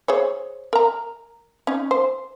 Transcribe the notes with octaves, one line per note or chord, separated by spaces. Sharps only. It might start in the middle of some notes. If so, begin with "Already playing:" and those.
G#4 C5 C#5
A#4 A#5
C#4 D#4
C5